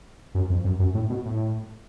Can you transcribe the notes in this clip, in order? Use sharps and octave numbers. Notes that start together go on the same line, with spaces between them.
F#2
F2
F#2
F#2
A2
B2
A2